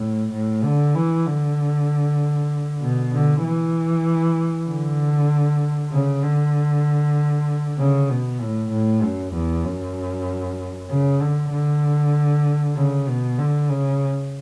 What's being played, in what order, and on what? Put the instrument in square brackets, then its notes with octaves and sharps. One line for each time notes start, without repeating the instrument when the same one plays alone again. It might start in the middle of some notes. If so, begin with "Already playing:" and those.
Already playing: [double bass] A2
A2
D3
E3
D3
B2
D3
E3
D3
C#3
D3
C#3
B2
A2
A2
F#2
E2
F#2
C#3
D3
D3
C#3
B2
D3
C#3